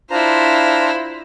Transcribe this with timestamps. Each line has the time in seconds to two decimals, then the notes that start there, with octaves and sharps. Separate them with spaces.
0.10 D4 E4 F4 C5 A#5